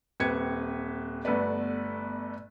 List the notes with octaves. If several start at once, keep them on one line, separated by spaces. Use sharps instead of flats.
D#1 C4 B4 G#6 C#7
G1 A3 B3 B4 D5